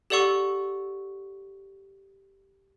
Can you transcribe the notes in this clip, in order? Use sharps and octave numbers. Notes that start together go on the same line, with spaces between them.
G4 A4 D5 F#5 C#6 E6